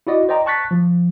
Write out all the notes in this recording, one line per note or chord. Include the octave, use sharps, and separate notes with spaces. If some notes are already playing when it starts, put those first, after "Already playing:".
E4 F#4 D5 D#5
C5 D5 D#5 G5 A#5
A5 C#6 F#6 A6 B6
F3